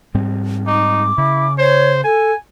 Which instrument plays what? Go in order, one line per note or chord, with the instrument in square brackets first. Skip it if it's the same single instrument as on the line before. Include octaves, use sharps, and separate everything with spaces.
[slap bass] G#2 G3 C4
[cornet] D#4 [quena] D6
[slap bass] C#3 [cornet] E4
[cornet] C5 [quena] C#5
[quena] A4 [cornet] G#5